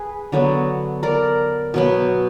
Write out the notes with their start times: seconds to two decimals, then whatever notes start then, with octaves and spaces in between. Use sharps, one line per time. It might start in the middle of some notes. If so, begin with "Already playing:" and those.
Already playing: G#4 B4
0.32 D3 F#3 B3
1.03 A#4 D5
1.74 B2 F#3 B3